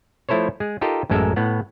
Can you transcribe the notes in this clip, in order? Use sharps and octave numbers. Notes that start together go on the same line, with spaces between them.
F3 A3 E4 A4 C5 C#5
G#3 G#4
D#4 F4 G4 A4 A#4 D#5
A1 F#2 G#3 A4 A#4 E5
A2 B3 F#5